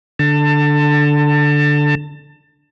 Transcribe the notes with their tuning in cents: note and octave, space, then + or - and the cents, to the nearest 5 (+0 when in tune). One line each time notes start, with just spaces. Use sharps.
D3 +0 A5 +25